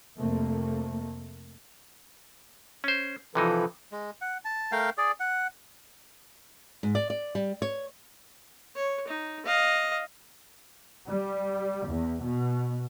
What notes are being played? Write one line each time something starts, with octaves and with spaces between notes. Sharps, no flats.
F2 C3 A3 A#3
C#4 C5
C3 E3 F3 D#4 A4 B4
G#3
F#5
A5
A3 A#4 F5 G5
G#4 D5
F#5
G#2
D5
D5
G3
C#5
C#5
D#4
D#5 F5
G3
E2
B2